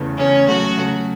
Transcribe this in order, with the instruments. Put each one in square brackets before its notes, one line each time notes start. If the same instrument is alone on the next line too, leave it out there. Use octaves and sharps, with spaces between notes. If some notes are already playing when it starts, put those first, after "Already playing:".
Already playing: [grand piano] E2 C#3 A3
[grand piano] E2 C#3 A3 [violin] C#4
[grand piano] C#3 F#3 A3 [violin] F#4
[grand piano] C#3 F#3 A3